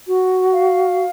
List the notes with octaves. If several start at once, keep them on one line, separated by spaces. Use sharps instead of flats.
F#4
F5